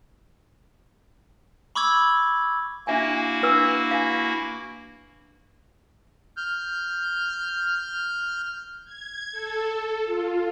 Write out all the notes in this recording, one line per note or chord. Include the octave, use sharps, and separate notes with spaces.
B5 C#6 D6 E6 G#6
A#3 D4 E4 F#4 E5 G#5
D4 B4 E6
F5 G#5
F6 G6
G#6
A4
F4